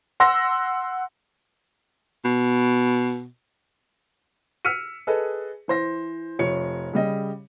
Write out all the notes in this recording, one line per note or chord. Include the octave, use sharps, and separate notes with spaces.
F#5 C6 E6 A#6
B2
E6 F6 B6 C#7 D#7
G#4 A4 B4 D#5
E3 C5 A#6
F1 F3 C#5 C#7
C#3 G3 D#5